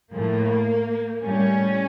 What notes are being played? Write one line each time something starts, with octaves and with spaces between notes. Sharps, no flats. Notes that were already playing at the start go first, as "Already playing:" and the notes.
A2 F3 A3 A#3
A2 G3 C#4